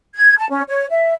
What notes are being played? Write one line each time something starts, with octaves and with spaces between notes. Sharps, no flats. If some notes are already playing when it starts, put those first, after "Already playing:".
G#6
A5
C#4
C#5
E5